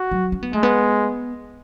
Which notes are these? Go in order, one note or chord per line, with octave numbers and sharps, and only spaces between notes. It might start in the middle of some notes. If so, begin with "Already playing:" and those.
Already playing: F#4
F#3
C#4
B3
G#3 A3
B3